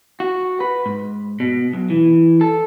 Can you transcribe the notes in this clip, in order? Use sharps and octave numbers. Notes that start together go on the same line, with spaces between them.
F#4
B4
G#2
B2
B1
E3
A4